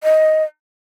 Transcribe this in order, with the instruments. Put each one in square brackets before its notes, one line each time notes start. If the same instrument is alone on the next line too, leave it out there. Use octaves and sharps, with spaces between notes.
[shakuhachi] D#5